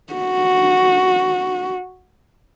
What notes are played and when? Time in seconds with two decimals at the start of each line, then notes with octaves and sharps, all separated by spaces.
0.13 F#4